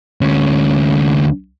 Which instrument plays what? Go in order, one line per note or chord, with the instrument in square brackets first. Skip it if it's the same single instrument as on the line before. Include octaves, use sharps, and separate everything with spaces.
[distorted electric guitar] D2 C#4